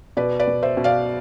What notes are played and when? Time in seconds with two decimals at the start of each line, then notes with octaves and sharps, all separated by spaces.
0.17 B2 B4 D5
0.39 B4 D5
0.47 B2
0.63 C5 E5
0.77 B2
0.84 D5 F5